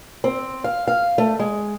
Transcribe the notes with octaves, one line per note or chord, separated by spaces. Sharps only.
C4
F5
F5
A3
G#3